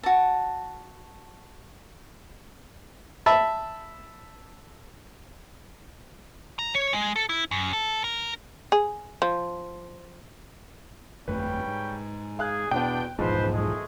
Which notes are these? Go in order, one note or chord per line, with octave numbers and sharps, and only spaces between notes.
F#4 A5
E5 A5 B5
A#5
C#5
G#3
A4
E4
F#2
A4
A#4
G#4
F3
G1 F2 G3 A3 B4 C#5 G5
G#2
G#4 F5 F#6
E2 B2 B3 D4 G5
D#1 B1 E2 G#2 F3 B4 C5
G#3 A3 G#4